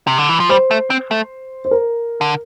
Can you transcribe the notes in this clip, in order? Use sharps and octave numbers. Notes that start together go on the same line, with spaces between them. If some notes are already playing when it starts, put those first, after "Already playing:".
C3
D3
E3
F3
G3 C5
A3
C4
A3
C5
A#4
D3